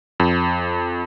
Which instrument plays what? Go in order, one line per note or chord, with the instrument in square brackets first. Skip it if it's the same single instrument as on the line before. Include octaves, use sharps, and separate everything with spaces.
[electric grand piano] F2